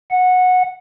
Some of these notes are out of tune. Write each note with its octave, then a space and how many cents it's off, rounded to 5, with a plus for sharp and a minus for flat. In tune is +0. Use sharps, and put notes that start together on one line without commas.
F#5 -15